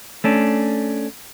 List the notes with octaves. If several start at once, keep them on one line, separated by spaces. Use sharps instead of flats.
A3 C#4 D4